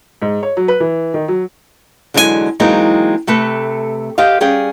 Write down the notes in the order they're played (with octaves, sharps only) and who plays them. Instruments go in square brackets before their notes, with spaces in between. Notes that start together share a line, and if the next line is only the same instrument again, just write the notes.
[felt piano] G#2
C#5
F#3
B4
E3
D#3
F#3
[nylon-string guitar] E2 D3 F#3 G#3 G#4 G#5
E3 F#3 G#3 A#3 C4 D#4
C3 A3 A4 B4
G4 C5 D#5 F5
G3 C#4 G#4 F5 G5